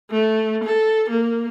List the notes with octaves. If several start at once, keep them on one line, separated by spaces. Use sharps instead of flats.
A3
A4
A#3